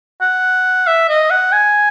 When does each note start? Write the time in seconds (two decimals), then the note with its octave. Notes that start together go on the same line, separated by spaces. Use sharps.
0.21 F#5
0.87 E5
1.09 D#5
1.30 F#5
1.52 G#5